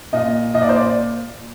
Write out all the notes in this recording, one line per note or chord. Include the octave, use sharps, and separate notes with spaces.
A#2 D#5
A#2 D#5
D5
C5
D5